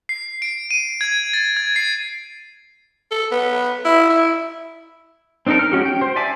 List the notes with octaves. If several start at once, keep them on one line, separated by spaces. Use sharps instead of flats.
C7
D7
D#7
G#6
A6
G#6
C7
A4
B3
E4
E4
C4 D4 D#4 A4 A#4
F6
G#3 C#4 F#4 G4
G5
C5
D5 E5 G#5 A5 D6